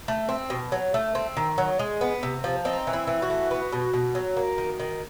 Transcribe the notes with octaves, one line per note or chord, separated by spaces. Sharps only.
A3
C4
B2
F#3
A3
C4
D#3
F#3
G#3
B3
C3
F3
C4 D#4
E3
E4
E3
F#4
A3
B3
B2
B2
F#3
A#3
D#3
D#3